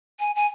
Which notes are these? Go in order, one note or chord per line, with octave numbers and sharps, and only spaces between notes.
G#5
G#5